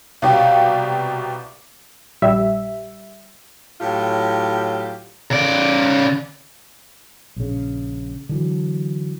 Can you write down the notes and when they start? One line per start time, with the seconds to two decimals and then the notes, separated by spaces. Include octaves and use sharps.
0.22 C2 B2 G4 D5 F5 D6
2.22 A#1 G3 E5
3.81 A2 F#3 F4 G4
5.31 C#3 D5
7.36 A#1 C#3
8.29 D3 E3 F#3